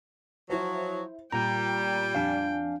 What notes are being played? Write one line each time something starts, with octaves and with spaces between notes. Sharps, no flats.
F3 F#3 E4 C5
A#2 G3 G5 A#5
F2 D4 F5 G#5